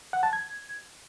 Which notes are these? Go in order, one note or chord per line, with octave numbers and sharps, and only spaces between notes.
F#5
A5
G#6